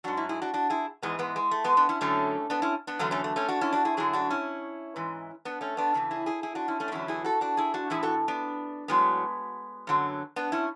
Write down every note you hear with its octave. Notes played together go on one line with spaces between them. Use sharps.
G#2 F#3 D4 F#4
C#4 E4
E4 G#4
D4 F#4
D4 F#4
E4 G#4
G#2 E3 G#3 B3
G#3 B3
G#3
A3
G#3 B3
B3 D4
C#4 E4
F#2 D3 F#3 A3 C#4
B3 D4
C#4 E4
B3 D4
E2 D3 F#3 A3 C#4
A3 C#4
A3
A3 C#4
D4 F#4
C#4 E4
D4 F#4
E4 G#4
F#2 D3 F#3 E4 G#4
D4 F#4
C#4 E4
G#2 E3
B3 D4
A3 C#4
B3 D4
E2 C#3 E3
E4 G#4
E4 G#4
E4 G#4
D4 F#4
C#4 E4
A3 C#4
D4
E2 D3 F#3 C#4 E4
E4 G#4
F#4 A4
D4 F#4
E4 G#4
D4 F#4
A2 E3 E4 G#4
F#4 A4
B3 D4
A2 F#3 G#3 B3
F#2 D3 F#3
B3 D4
C#4 E4